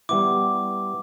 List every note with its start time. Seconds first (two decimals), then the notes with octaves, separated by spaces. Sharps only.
0.09 G3 B3 E4 D6